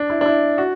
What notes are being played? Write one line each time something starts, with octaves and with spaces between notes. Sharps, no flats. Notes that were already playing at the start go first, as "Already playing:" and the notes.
Already playing: D4
E4
D4
E4
F#4